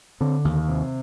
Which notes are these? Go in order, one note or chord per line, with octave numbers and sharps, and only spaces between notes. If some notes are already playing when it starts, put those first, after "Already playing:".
D3 C4
D#2
C3